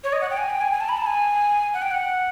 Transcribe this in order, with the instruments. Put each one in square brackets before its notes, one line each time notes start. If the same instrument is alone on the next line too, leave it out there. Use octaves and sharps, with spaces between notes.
[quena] C#5
D#5
F#5
G5
G#5
G5
G#5
G#5
A5
B5
A5
G#5
F#5
G5
F#5